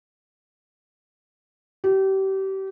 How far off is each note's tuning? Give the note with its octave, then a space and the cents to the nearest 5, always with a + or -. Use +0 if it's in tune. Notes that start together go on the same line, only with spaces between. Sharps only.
G4 -30